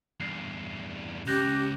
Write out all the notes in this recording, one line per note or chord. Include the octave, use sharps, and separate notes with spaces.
E2 G2 C7
C#2 C#4 G4 F#6 G6 A#6